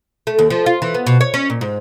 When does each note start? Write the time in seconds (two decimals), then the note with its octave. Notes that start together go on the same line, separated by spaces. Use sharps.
0.27 A3
0.39 D#2
0.50 F3
0.66 F4
0.82 E3
0.94 B3
1.07 B2
1.21 C#5
1.34 C#4
1.50 A#2
1.61 G#2